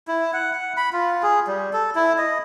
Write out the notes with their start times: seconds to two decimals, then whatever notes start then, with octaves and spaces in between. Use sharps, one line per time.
0.08 E4
0.33 F#5
0.53 F#5
0.77 B5
0.93 F4
1.23 G#4
1.47 G3
1.73 A4
1.95 E4
2.18 D#5